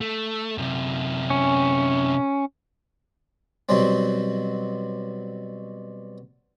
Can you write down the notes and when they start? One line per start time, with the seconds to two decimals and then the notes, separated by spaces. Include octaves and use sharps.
0.01 A3
0.58 F#2 C3
1.30 C#4
3.69 B2 F#3 G3 C4